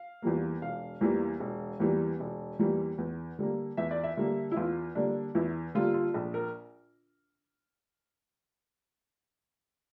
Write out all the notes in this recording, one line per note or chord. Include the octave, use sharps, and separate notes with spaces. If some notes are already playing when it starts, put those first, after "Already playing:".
Already playing: F5
E2 E3 G3 A#3
E1 F5
E2 E3 G3 A#3
E1
E2 E3 G3 A#3
E1
E2 E3 G3 A#3
E2
D3 G3 A#3
E2 E5
D5
E5
D3 G3 A#3
E4
E2 F4
D3 G3 A#3 D4
E2 E4
D3 G3 A#3 F4
F4
A#1
A#4